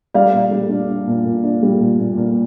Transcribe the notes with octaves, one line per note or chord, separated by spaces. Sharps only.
G3 D5 F5
A#2
G3
D4
D4
A#2
A#2
D4
G3
A#2
A#2
A#2